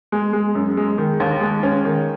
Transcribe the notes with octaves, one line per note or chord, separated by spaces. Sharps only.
G#3
G#3
F#2
G#3
D#3
D#2
G#3
C#4
D#3